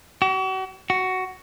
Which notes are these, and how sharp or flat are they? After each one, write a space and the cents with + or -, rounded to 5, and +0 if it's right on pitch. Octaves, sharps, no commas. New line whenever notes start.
F#4 +40
F#4 +10